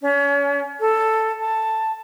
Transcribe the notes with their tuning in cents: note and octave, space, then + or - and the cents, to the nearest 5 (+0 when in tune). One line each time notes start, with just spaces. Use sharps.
C#4 +35
A4 +5
A5 +5